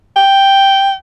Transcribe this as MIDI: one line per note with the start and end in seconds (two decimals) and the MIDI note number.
0.16 0.93 79